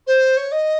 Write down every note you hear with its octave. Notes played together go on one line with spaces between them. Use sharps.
C5
C#5
D#5